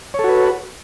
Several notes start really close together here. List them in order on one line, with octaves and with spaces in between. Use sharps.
C#5 A4 F#4 B4